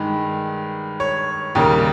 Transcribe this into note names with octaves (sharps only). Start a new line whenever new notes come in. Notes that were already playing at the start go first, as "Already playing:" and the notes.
Already playing: G2 D#3 G#3
C#5
D#2 C#3 G3 A#3